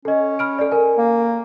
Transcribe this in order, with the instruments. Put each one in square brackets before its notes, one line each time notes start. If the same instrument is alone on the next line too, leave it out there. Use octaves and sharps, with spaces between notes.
[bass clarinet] C#4 [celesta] A4 D#5
[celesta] B5 F6 D7
A4 D5
A#4 G#5
[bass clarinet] A#3